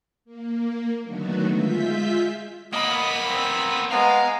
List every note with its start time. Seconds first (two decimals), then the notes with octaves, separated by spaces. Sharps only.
0.25 A#3
1.02 D3 D#3 F#3 A3 B3 F#4
1.51 G#3 F4 E5 G6 B6
2.73 A#3 B3 D#5 B5
3.26 C4
3.92 G#3 B3 F5 A#5